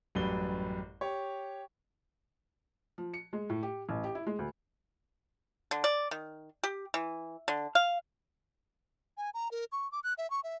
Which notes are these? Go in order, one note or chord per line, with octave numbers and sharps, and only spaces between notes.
A1 F#2 G3 B4 G7
G4 C#5
F3
C#7
G#3
A2
G4
A1
G4
E4
G#3
D2
D3
D5
D#3
G4
E3
D3
F5
G#5
A#5
A#4
C#6
D6
F#6
E5
C#6
E5